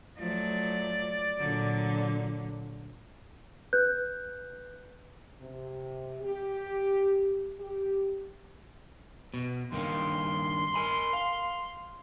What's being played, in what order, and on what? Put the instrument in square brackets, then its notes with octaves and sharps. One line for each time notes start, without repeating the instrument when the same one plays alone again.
[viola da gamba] F3 F#3 A3 [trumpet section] D5
[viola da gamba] A#2 D3 F#3
[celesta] B4 F#6 G6
[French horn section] C3
G4
G4
[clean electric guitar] B2
[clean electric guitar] G2 D#3 A#3 [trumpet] C6
[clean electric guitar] A#4 G#5 B5
F5